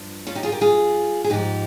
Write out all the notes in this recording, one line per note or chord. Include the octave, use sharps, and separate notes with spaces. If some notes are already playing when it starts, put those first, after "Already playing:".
Already playing: G2 F3
C#4 F4
D#4 G4
F4 G#4
G4 A#4
F4 G#4
G#4
G#2 F3 D#4 G4